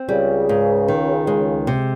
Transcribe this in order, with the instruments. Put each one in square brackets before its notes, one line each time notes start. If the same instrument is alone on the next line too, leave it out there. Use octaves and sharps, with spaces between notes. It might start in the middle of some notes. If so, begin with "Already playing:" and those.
Already playing: [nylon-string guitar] C4
[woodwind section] C#2 C#3 [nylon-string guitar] G3
[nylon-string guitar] G#2
D#3
G#3
C3